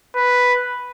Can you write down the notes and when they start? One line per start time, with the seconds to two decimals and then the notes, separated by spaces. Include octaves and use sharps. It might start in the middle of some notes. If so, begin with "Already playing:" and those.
0.16 B4